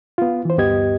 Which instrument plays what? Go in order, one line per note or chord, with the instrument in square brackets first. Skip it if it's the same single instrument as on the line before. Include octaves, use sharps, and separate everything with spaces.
[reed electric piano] B3 F4
E3 C5
D2 G2 B3 G4 D#5 G#6